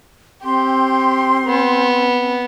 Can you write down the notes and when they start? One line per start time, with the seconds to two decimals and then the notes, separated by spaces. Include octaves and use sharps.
0.43 C4 G4 C6
1.45 B3